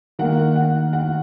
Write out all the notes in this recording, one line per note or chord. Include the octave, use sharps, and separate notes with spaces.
D#3 A#3 F#5
F#5
F#5